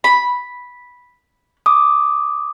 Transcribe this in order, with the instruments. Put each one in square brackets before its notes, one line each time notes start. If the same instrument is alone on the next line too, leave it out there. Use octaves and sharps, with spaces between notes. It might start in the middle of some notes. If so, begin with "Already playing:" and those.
[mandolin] B5
[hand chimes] D6 D#6